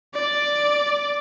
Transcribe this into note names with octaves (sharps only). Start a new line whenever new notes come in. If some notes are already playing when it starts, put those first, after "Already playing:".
D5